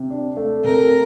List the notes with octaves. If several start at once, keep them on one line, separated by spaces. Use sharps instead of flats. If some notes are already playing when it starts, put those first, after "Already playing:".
Already playing: C3
D4
A3
C3 A#4